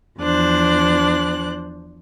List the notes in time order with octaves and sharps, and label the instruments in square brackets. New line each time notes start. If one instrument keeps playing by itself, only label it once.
[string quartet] E2 F3 D4 C5 F#6